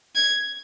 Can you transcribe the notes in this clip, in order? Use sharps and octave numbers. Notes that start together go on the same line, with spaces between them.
G#6